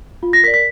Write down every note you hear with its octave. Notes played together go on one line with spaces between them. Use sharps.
F4
A#6
A#4 D5 B6
B6